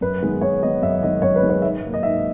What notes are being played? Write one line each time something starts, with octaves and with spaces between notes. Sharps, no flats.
F#2 B4
D#3 G#3 B3
F#2 C#5
D#3 G#3 B3 D#5
F#2 E5
D#3 G#3 B3 D#5
F#2 C#5
B4
D#3 G#3 B3
C#5
G#2 E5
F#3 A#3
D#5
G#2 E5